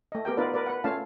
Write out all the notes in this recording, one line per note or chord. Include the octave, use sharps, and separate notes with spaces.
A3 D#5
B3 G4 A#4 G5
B3 D#4 F4 A#4 B4 D5
A#4 B4 D5
B4 F#5
A3 C#4 F4 F5 A5